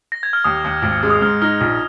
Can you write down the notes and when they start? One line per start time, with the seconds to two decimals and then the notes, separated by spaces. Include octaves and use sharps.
0.12 A#6
0.23 G#6
0.33 F6
0.44 D#2 D#6
0.64 D#2
0.83 G#1
1.03 G#3
1.10 D#6
1.21 G#2 F6
1.42 D#4 F6
1.61 A#1 F6